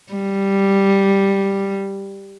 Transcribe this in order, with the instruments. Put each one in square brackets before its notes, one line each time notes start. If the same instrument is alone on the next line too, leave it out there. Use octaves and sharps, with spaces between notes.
[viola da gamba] G3